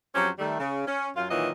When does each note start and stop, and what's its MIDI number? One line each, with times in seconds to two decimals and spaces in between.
0.15 0.30 41
0.15 0.30 54
0.15 0.30 61
0.15 0.30 65
0.15 0.30 67
0.15 0.30 72
0.39 0.59 51
0.39 0.59 55
0.39 0.59 57
0.59 0.86 49
0.87 1.08 61
1.16 1.26 42
1.16 1.26 65
1.31 1.50 46
1.31 1.50 51
1.31 1.50 52
1.31 1.50 54
1.31 1.50 65
1.31 1.50 75